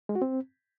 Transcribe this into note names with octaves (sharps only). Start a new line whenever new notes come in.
G#3
F#4
C4